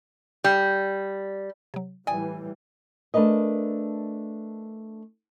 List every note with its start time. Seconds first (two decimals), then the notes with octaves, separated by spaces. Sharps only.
0.44 G3
1.74 C3 F#3
2.07 A2 E3 G3 D5 G5 G#5 D#6
3.14 A3 D4 A#4 B4 D#5